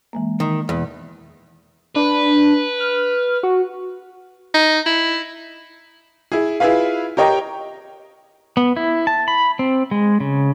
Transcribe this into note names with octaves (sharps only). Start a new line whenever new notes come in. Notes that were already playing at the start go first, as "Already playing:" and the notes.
E3 G#3 A#3
D#3
E2 B2
D4 B4
F6
F#4
D#4
E4
E4 G#4
E4 F4 G#4 B4 F5
G4 A#4 C#5 D#5 G5 A#5
B3
E4
A5
B5
C4
G#3
C#3